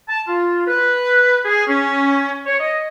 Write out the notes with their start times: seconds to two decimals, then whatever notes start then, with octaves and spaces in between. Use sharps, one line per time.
0.09 A5
0.28 F4
0.67 B4
1.45 G#4
1.67 C#4
2.46 C#5
2.60 D#5